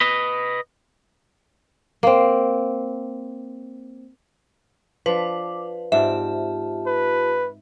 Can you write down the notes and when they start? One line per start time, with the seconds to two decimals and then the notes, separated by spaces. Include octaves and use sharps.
0.01 B4 D#5
2.03 A#3 C4
5.06 F3 D4 B4 D6
5.92 G#2 C4 F4 G4 D5 E5 A5
6.87 B4